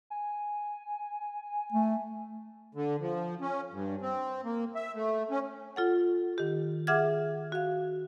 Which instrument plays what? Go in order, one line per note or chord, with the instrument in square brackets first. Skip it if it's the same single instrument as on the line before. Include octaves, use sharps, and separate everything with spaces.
[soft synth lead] G#5
[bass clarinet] A3
[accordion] D3
F3
C#4
G2
C4
A#3
E5
A3
C#4
[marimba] F4 A4 F#5
D#3 G4
G#4 E5 F#5 D6 F6 G#6
F#4 F5